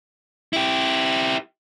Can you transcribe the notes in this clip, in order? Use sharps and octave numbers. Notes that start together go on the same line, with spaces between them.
E4 G4